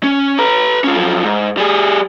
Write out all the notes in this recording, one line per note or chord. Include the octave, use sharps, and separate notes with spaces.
C#4
B4 A#5
C#4 F4
F#2 F3
G#2
G3 G#4